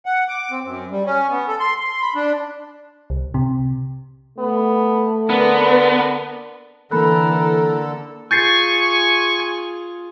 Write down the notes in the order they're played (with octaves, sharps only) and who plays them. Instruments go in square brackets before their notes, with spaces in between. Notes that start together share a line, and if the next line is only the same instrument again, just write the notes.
[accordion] F#5
D6
C4
F#2
G3
C#4
B3
A4
C6
C6
B5
D4
[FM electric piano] C2
C3
[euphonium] A3 [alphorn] B3
[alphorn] D3 [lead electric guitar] B3 [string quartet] A#4 B4
[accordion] D3 A4 [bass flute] E3 [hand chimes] A#3 B5 F#6 [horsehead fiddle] A#4
[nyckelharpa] F4 G#4 [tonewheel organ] G#5 C#6 [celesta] G6 A6 C7